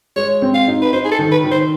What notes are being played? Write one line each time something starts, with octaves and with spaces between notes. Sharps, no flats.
G#3 C#5
C4
F5
D#4
B4
D#4 C5
G#4
A4
D#3
B4
D#3
C5